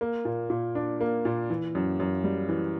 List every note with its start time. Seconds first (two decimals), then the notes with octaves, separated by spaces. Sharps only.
0.01 A#3
0.25 A#2
0.50 A#2
0.75 D4
1.01 A#3
1.25 A#2
1.50 E3
1.75 F#2
2.00 F#2
2.24 G3
2.49 E3